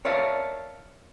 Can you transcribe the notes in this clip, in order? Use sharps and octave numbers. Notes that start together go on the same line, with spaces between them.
A#4 C#5 D5 E5 F5 A5